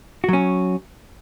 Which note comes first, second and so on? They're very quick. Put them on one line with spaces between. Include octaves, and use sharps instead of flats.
F#4 F#3 C#4